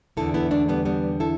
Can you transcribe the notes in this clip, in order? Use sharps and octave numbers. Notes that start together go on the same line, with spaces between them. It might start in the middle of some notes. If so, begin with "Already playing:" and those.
E2 D3 E4 A4
B3 E4
A3 D4
G3 B3
G3 B3
E4 A4